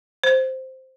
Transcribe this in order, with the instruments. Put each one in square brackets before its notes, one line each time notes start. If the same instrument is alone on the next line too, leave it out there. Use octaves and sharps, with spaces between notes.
[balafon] C5